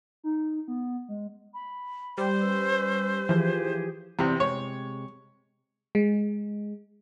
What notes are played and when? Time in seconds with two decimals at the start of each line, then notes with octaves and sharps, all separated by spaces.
0.24 D#4
0.68 B3
1.09 G#3
1.53 B5
2.18 G3 C5
2.41 C#4 B4 E6
3.29 E3 F3 G4 G#4
4.19 E2 C3 C4 D5
4.40 C3 G#3 C#5
5.95 G#3